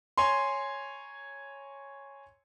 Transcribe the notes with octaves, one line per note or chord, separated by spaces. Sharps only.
C#5 G#5 A#5 C6